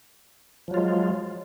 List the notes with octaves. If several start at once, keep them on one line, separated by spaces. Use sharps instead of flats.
F3 F#3 G#3 F4